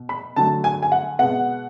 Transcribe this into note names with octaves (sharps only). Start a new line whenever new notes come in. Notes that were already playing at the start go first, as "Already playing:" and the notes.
Already playing: B2
B5
D3 F#3 A3 A5
G#5
G#5
F#5
B2 G#3 B3 F#5